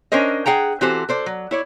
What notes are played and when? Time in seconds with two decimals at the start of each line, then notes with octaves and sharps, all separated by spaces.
0.12 C#4 D4 A#4 C5 D#5
0.46 G#4 F#5 G5 A#5
0.81 E3 C4 F#4 G4 A4 C5
1.09 A4 C5 D5
1.26 F#3
1.51 E4 C#5 D5